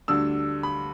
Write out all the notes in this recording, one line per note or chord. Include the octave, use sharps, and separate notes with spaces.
D2 D3 G3 D4 E6
B5